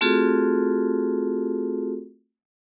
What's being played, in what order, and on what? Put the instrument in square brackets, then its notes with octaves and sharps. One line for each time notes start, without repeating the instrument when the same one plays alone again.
[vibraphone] A3 C4 F4 F#4 G#4 A4